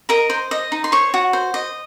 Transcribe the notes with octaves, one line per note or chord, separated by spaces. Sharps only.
A#4 D#5 A#5
C5
D#5
D#4
C6
C5 C#5 C#6
F#4
C5
D#5